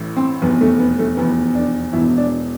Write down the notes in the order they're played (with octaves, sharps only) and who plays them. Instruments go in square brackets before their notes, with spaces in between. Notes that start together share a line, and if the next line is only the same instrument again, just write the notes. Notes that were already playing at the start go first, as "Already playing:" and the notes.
Already playing: [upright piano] A1 A2 E3
C4
F1 E2 B2 B3
A3
B3
A3
F1 E2 B2 B3
D4
E1 E2 B2 E4
D4